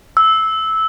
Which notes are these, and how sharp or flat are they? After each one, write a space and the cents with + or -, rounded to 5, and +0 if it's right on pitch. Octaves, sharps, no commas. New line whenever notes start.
E6 -10